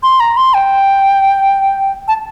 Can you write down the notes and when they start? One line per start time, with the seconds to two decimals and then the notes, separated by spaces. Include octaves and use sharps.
0.03 C6
0.20 A#5
0.37 C6
0.54 G5
2.08 A5